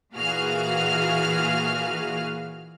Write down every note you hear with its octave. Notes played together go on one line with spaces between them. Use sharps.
A#2 E3 F#4 G#4 F5 F6